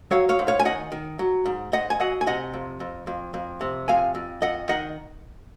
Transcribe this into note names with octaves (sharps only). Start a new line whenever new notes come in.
F#3 C#5 F5
C#5 F5
G#2
C#5 F5
G#5
D#3 D#5 F#5
D#3
F#3
G#2
G#2 D#5 F#5
G#5
F#3 D#5 F#5
G#5
C3 D#5 F#5
F2
F2
F2
F2
C3
F2 F5 G#5
F2
F2 D#5 F#5
D#3 D#5 F#5